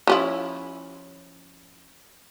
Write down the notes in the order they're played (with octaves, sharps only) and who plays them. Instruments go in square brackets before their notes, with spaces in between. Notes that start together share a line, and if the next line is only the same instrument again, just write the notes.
[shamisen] F3 C#4 E4